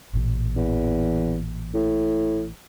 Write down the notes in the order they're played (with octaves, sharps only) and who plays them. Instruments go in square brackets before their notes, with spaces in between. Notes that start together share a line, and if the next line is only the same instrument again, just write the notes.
[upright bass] A1 A#2
[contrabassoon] E2
A2